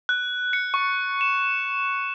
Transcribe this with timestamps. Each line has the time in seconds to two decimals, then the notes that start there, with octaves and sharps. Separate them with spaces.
0.09 F#6
0.53 C#7
0.74 C#6
1.21 E7